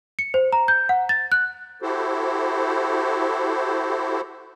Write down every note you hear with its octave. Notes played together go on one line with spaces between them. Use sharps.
C#7
C5
A#5
G6
F#5
A6
F#6
E4 F#4 G4 A4 C5